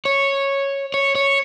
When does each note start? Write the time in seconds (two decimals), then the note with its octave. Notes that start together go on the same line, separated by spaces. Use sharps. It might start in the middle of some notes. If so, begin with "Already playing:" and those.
0.05 C#5
0.94 C#5
1.15 C#5